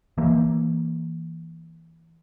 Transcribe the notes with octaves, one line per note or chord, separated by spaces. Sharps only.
E3 A#3